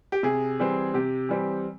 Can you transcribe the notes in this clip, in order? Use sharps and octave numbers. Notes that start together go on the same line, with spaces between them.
G4
C3 G#4
E3 G3 C4
C3 G4
E3 G3 C4